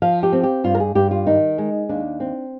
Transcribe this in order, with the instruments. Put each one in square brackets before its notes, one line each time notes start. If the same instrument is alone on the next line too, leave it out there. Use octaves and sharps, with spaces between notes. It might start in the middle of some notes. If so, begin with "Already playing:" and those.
[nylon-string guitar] F3 F5
G4
C4
G4
G2 F4
A#4
G#4
G2 G4
F4
D#3 D#4
G#3
D#2 D4
C4